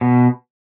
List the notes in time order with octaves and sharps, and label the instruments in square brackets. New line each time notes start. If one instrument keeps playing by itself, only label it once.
[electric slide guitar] B2